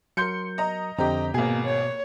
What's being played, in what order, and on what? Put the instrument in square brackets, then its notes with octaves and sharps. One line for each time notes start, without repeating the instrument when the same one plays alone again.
[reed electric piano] F#3 A#4 [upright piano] C6 G6 C#7
[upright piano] D#5 A#5
[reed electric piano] F2 D3 C4 [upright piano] G4 A#5 [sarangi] D#5
[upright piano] G#1 G#4 [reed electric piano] B2 [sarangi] A#3
[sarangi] C#5